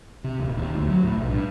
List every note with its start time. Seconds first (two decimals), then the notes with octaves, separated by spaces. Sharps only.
0.24 C3
0.40 D#1
0.57 D#2
0.75 D2
0.89 F#3
1.04 A2
1.17 B1
1.29 G2